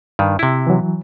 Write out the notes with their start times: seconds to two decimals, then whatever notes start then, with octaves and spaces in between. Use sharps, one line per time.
0.19 G2 D#3
0.39 C3 E4
0.67 E3 F#3